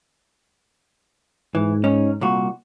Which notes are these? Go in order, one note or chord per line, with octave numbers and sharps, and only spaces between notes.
G#2 E3
C#4 D#4
C2 A#2 F#4